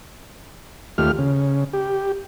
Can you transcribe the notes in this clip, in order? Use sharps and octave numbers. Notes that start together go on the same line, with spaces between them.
D#2 A3 F4 G4 F6
C#3
G4